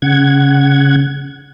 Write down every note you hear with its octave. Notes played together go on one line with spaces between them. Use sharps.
C#3 F#5 G#6